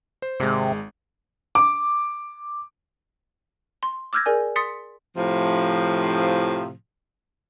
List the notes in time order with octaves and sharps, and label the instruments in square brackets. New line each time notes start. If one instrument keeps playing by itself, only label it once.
[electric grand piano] C5
[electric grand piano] G#1 G#3 [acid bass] C3
[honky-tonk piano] D6
[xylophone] C6
D6 E6 F6 G6 G#6 A#6
G#4 A#4 D5 G#5
C6 D#6 A6 B6 C#7
[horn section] A2 C3 F3